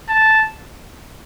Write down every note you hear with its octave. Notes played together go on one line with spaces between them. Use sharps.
A5